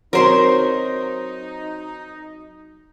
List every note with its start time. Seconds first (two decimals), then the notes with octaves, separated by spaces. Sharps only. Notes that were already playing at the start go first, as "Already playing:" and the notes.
0.13 F#3 C4 D#4 A#4 C5 C6